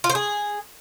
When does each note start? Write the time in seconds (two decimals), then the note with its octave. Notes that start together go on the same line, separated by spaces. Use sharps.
0.04 F4
0.10 C5
0.15 G#4